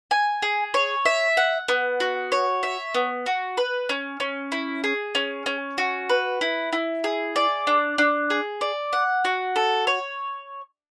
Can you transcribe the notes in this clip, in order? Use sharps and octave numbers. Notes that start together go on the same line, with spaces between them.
G#5
G#4
C#5
E5
F#5
B3
F#4
C#5
E5
B3
F#4
B4
C#4
C#4
E4
G#4
C#4
C#4
F#4
B4
E4
E4
G#4
D5
D4
D4
G#4
D5
F#5
F#4
A4
C#5